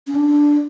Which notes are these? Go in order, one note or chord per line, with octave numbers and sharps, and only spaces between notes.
C#4
D4